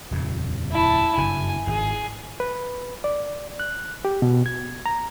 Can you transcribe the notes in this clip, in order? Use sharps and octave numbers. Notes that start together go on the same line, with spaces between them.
D#1 F2 C#3
E4 A5
F#1 G2 G#5
G#1 G#4
B4
D5
F#6
G4
B2
G#6
A#5